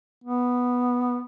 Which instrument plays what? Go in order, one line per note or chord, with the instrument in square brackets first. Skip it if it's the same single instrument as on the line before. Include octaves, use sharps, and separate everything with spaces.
[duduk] B3